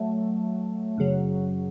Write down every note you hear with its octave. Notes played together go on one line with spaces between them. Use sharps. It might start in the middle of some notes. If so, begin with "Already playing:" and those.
Already playing: F#3 A3
F#2 C#3 F#3